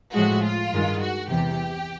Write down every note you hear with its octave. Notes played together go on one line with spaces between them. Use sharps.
A2 F3 G#3 F#4
F4
G2 D#3 G#3
F#4
E2 C3 E3 G4